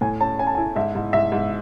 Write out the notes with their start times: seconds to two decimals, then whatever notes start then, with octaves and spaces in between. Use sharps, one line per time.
0.01 A2 G#5
0.20 C#4 A5
0.39 C#4 G#5
0.47 A5
0.55 G#5
0.58 E4
0.76 G#2 E5
0.95 G#2
1.13 G#2 E5
1.32 G#2